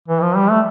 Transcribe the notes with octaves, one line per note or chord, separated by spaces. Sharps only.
E3
F3
G3
A3